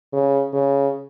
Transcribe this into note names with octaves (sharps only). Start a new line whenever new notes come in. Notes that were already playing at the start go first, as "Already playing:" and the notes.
C#3
C#3